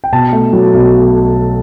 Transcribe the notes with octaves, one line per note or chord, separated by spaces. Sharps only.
G5
B2 A5
A3
F#3
B1